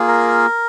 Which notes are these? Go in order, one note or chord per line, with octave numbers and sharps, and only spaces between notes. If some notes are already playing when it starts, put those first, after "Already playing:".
Already playing: A#3 F4 G#4
A#4